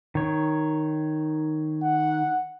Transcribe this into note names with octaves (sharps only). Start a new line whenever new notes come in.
D#3 C#5
F#5